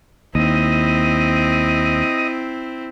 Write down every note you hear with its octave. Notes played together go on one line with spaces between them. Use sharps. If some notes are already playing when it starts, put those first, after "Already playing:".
D#2 C4 E4 D#5